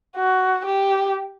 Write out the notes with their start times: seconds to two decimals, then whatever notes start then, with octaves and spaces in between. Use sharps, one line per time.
0.16 F#4
0.65 G4